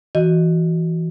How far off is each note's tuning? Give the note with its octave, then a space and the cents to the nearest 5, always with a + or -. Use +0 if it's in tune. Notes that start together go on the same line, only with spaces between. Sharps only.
E3 +0 F#4 +0 D#5 -10